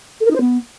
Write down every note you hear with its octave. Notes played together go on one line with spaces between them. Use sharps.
A4
A#4
D#4
C5
B3